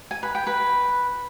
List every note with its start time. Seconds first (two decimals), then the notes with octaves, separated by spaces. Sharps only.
0.11 G#5
0.23 B4
0.35 G5
0.47 B4